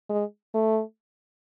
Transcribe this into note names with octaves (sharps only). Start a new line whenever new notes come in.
G#3
A3